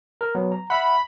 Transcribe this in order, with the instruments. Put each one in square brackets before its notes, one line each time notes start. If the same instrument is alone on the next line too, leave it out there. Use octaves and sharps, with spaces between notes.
[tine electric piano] A#4
F#3 B3
A#5
[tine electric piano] E5 F#5 [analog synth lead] B5